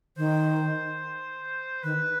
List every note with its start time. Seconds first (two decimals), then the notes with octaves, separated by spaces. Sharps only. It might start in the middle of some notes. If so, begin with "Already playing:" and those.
0.17 D#3 C5
1.83 D#3 B4